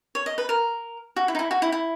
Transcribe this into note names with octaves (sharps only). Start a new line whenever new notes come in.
C#5
D#5
B4
A#4
F#4
E4
D#4
E4
F#4
E4
E4